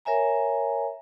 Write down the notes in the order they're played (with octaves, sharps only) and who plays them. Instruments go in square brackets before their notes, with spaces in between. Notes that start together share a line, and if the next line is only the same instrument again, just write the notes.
[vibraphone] A#4 C#5 E5 G#5 A#5